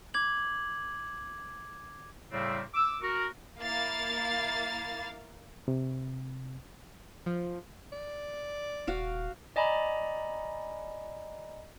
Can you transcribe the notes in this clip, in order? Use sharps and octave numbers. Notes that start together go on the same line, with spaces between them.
D6 G#6 F#7
A2 C#3 G3 A3 A#3 C4
D6 E6
F#4 A#4
A#3 E4 F5 A6
C3
F3
D5
D#1 F#4 F5 D6
D5 D#5 G#5 A#5 B5